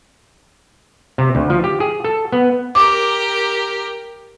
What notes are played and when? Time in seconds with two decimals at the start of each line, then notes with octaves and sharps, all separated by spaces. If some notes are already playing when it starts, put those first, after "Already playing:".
1.18 C3
1.35 D2
1.50 F3
1.64 G4
1.80 G#4
2.04 A4
2.32 B3
2.75 G4 A#4 D6